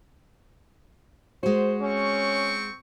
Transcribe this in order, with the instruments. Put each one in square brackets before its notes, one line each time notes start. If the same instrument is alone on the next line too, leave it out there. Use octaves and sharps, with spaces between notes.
[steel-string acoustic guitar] G#3 F#4 [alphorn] C5
[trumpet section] C4 C#6 [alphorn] C#4